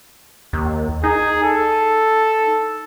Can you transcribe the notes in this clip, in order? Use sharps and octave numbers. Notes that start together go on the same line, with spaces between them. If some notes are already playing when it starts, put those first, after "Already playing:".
D#2
D#4 G#4
A4